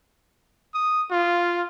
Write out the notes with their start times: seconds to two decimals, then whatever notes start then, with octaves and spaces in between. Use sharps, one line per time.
0.74 D#6
1.11 F4